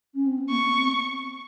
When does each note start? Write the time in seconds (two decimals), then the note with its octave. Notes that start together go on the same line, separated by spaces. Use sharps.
0.14 C#4
0.26 C4
0.38 B3
0.50 A#3 C#6
0.64 B3
0.79 C4